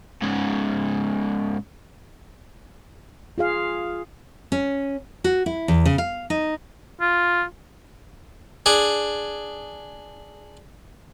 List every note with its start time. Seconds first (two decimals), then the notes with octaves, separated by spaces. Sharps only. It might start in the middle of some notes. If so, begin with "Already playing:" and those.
0.22 G#2 C#3
3.38 F4 G#4 F5
4.52 C#4
5.24 F#4
5.46 E4
5.68 E2
5.85 C#3
5.98 F5
6.30 D#4
7.01 F4
8.66 D4 G#4